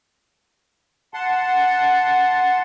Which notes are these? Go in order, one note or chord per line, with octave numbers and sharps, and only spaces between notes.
F#5 A5 C6